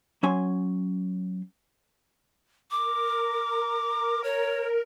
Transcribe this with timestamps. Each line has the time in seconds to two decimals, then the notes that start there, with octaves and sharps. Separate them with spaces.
0.23 F#3 C#4 G#5 C6
2.71 A#4 D6
4.24 C#5